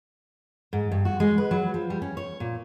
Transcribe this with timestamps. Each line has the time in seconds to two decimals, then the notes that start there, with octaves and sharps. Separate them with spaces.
0.73 G#2
0.91 G2
1.05 F#4
1.20 G#3
1.38 B4
1.51 F#3
1.74 F3
1.90 G3
2.02 C#4
2.17 C#5
2.40 A#2